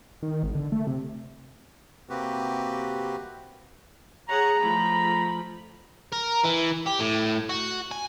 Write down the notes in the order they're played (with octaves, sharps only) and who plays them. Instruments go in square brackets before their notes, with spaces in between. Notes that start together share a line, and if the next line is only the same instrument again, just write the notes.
[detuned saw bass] D#3
G#1
D3
A3
C3
[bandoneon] C3 A#3 C4 F#4 G4 B4
[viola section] G#4 C#5 F#5 [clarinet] A#5
[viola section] F3 A3 B5
[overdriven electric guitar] A#4
E3
G4
A2
F#4
G#5